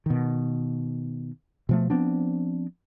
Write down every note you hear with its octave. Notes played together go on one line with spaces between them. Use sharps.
B2 D#3
B2 F3 A3
F3 B3 C4 D4